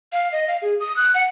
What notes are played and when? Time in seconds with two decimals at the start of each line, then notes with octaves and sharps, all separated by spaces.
0.13 F5
0.32 D#5
0.48 F5
0.62 G#4
0.80 D#6
0.96 F#6
1.14 F#5